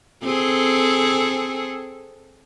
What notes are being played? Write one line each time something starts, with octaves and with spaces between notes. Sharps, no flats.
C4 G#4 A4